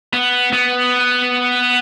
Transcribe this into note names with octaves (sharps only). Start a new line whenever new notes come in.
B3
B3